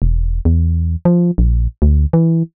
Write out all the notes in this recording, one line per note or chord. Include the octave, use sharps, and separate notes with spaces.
E1
E2
F3
A#1
D2
E3